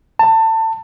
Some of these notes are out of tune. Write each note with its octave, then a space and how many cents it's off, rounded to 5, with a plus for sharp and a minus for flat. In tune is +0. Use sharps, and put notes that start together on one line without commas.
A5 +25